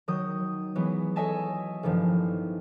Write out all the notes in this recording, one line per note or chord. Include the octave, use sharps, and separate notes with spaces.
D#3 F#3 D#6 G6
E3 F#3 G#3 B3
A4 C#5 D#5 E5 G#5 A5
A1 G2 D#3 F3